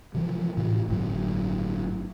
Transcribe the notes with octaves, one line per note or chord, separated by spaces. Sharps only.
C3 E3 F3
A2 C3 E3
G1 A2 D3 F#3